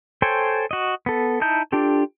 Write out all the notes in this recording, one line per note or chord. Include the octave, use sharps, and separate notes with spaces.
A4 C5 C#5 G5 G#5
F#4 D#5
B3 A4
D#4 E4 A5 G6
D4 F4 G4 A4